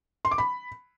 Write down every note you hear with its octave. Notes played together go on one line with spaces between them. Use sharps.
C6
D6
B5